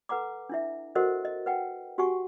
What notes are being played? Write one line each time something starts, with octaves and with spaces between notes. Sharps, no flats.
A4 B4 F#5 A#5 D6
D4 E4 E5
F#4 A4 A#4 C5 D#5 F#5
D#5
B4 F#5 G5
F#4 G4 F#5 G#5 C#6